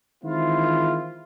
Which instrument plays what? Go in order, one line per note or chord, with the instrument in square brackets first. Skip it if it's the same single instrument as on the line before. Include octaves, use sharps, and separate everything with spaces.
[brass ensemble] D#3 E3 G#3 C4 E4 F4